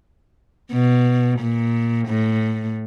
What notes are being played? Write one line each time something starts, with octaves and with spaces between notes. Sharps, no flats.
B2
A#2
A2